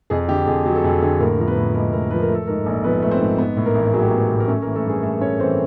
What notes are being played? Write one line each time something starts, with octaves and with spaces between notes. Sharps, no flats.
F2 G#4
D3 G4
F2 G#4
F#3
A4
F2 G#4
D3 G#4
A2 A#3 A#4
F3 A#4
B3 B4
A2
G#3 A#3 A#4
A2 A#3 A#4
F3 B4
A#4
A3
A4
G#2 A#3 A#4
A#1
F3 B3 B4
A3 B4
C4 C5
G#2
B3
A2
A#3 A#4
A1
F#3 G#4
G4
G#4
B3
A2
A#4
A3 C#4 A4
A#3 A#4
E3
A3 A4
G2 G#4
A3 A4
C#4 C#5
E3 C4 C5